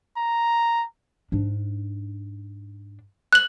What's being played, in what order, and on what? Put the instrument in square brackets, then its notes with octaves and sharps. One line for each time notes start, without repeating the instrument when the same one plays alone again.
[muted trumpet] A#5
[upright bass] G#2 D4
[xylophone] F#6 F#7